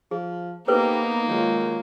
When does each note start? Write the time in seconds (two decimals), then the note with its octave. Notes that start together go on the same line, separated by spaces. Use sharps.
0.11 F3 G#4
0.68 A#3 B3 D#4 G4 A4 B4 C5
1.28 D#3 F#3 G#3 F4